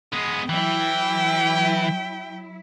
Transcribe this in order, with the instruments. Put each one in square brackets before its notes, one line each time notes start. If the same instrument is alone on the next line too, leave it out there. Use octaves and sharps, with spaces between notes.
[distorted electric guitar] G#3 B3 [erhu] D#6
[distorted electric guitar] E3 [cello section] F#3 E4 [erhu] G5